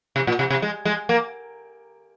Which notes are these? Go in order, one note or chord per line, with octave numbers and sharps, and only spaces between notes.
C3
A#2
C3
C3
G#3
G#3
A#3